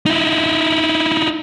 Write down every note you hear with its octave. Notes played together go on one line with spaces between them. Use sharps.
D#4 E4